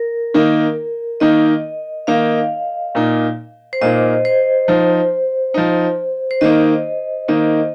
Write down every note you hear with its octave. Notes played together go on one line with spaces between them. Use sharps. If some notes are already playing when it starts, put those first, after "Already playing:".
Already playing: A#4
D#3 A#3 D#4
D#3 A#3 D#4 D#5
D#3 A#3 D#4 F5
A#2 A#3 D#4
C5
A#2 A#3 D#4 D#5
C5
F3 D#4
F3 D#4
C5
D#3 A#3 D#4 D#5
D#3 A#3 D#4 D#5